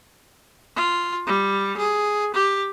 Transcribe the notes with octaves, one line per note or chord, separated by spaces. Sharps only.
F4
G3
G#4
G4